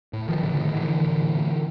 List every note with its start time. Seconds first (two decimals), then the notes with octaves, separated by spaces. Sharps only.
0.13 A2
0.28 A1 D#3 F3
0.43 A1 D3
0.55 D3
0.59 A2 D#3
0.73 A2 D3 E3
0.89 A1
1.04 A1
1.20 A2
1.35 A2